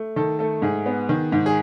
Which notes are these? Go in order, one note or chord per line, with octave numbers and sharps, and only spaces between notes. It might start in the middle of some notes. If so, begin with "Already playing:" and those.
Already playing: A3
D#3 A4
A3 A4
G#2 G#4
B3
D#3
G#2
G#4